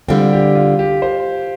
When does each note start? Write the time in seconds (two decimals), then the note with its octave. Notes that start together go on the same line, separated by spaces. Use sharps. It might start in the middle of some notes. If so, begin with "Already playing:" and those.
0.09 D3 G3 C4 F4
0.33 G4
0.55 F4
0.79 G4
1.02 C5